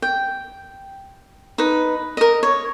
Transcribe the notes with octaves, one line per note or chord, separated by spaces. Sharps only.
G5
D#4 B4
A#4 D#5
C#5